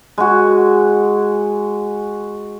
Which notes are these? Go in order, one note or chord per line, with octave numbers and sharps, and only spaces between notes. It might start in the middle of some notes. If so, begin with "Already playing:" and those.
G#3 F#4